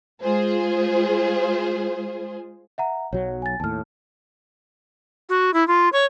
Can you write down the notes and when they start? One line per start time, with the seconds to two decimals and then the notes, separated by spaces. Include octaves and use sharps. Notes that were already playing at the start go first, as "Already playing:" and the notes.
0.21 G#3 F4 G#4 C5
2.78 E5 F#5 A#5
3.13 B1 F#3 C#5
3.42 G#5 A6
3.60 D#2 A2 A5 F6
5.29 F#4
5.54 E4
5.67 F4
5.93 C#5